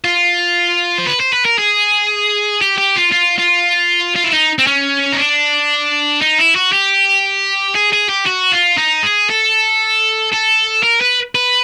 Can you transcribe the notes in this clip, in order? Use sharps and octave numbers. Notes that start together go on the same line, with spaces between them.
F4
C5
B4
C5
B4
A#4
G#4
G4
G4
F4
F4
F4
F4
E4
D#4
C4
C#4
D#4
D4
D#4
E4
F#4
G4
G#4
G#4
G4
F#4
F4
D#4
G#4
A4
A4
A#4
B4
B4